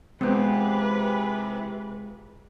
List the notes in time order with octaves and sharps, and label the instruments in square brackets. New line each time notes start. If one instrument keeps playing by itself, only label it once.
[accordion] C3 E3 [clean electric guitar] G#3 F4 G4 [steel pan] B3 C4 [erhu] B4